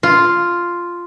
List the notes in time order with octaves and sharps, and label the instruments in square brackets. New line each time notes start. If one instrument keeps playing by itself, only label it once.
[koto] F4